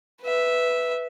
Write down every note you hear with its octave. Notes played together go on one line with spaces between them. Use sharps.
B4 E5